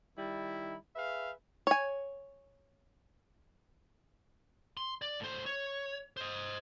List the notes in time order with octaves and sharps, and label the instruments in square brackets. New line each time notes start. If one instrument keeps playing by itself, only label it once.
[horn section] D#3 G3 E4
G#4 B4 E5 F5
[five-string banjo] C#5 G#5
[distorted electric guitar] C6
D5
A2 C5
C#5
C5 D#5